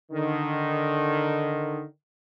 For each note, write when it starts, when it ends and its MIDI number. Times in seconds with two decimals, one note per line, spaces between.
0.12 1.84 50
0.12 1.84 51